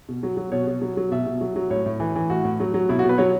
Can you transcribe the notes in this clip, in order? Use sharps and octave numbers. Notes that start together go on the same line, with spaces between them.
B2
F#3
F#3
B2 C#5
B2
F#3
F#3
B2 E5
B2
F#3
F#3
A2 C#5
A2
E3
E3
A2 F#4
A2
F#3
F#3
B2 E4
F#4
B2
B4
F#3 C#5